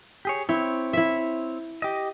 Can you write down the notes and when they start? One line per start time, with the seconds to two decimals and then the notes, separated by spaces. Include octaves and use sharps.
0.25 G4 G#4 C#5
0.49 C4 E4 C#5
0.93 E4 E5
1.82 G4 D#5